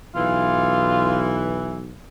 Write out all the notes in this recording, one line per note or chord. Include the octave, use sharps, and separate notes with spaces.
B1 E3 F4